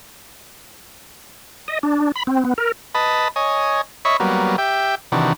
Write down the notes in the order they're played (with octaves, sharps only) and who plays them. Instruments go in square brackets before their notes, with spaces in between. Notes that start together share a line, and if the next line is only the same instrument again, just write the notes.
[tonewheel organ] D#5
D4
B5
C4
B3
A#4
[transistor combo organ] B4 D#5 A5 B5
C#5 D#5 G#5
C#5 D#5 E5 B5 C#6
F#3 G3 A#3 B3
G4 E5 G5
C3 D#3 E3 D4 F#4